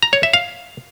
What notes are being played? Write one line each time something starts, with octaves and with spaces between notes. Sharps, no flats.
A#5
C#5
E5
F5